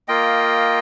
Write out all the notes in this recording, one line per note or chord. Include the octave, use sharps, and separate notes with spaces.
A#3 F4 D#5 G5